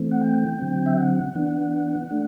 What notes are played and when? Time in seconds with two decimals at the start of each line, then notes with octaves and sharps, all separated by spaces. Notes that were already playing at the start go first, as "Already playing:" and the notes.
Already playing: E3 A3 C4
0.11 F#5
0.21 G5
0.59 D3 F#3 C4
0.86 E5
0.98 F#5
1.35 E3 B3 D4
2.11 A3 D4